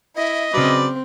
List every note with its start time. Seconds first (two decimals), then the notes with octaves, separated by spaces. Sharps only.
0.16 E4 D#5 E5
0.54 C#3 F#3 C4 B4 D5